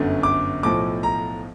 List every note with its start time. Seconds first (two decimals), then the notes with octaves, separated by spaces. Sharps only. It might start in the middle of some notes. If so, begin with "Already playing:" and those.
Already playing: G1 F#2 D3
0.23 D6
0.63 B1 A2 F3 D6
1.03 A#5